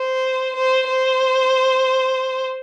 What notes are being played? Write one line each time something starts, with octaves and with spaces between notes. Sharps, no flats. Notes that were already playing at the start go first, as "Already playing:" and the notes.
Already playing: C5
C5
C5